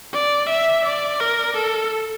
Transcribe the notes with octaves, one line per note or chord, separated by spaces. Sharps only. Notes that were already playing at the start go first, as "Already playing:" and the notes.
D5
E5
D5
A#4
A4